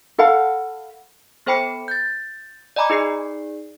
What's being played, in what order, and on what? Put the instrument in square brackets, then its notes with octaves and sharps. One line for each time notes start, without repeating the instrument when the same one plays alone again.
[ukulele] A4 F5 F#5 B5
[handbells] B3 A4 C5 G5 B5 C#7
G6 A6
D5 D#5 G#5 A#5 B5 D6
D#4 G#4 D5 C7